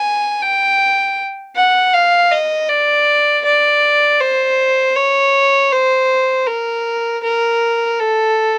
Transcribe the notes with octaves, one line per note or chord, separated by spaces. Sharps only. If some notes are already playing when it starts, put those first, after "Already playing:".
Already playing: G#5
G5
F#5
F5
D#5
D5
D5
C5
C#5
C5
A#4
A#4
A4